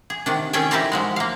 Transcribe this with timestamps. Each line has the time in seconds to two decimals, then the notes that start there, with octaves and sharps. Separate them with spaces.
0.10 G#4
0.26 C3 D#3 D4
0.53 D#3 C#4 G#4 A4 G5 G#5
0.71 D#4 E4 G4 A#4 C5 D5
0.92 F3 F#3 G#3
1.16 A#3 F5